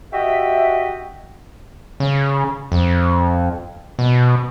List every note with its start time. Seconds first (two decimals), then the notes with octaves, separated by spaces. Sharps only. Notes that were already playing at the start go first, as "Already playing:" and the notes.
0.13 F#4 G4 D#5 E5
2.00 C#3
2.72 F2
3.99 B2